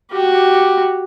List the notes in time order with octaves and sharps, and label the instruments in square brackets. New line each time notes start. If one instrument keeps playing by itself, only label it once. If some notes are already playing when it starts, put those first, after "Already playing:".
[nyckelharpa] F#4 G4